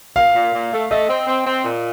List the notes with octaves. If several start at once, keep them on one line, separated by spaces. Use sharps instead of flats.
A#2 F5
A#2
A#2
A3
A3 D#5
C4
C4
C4
A#2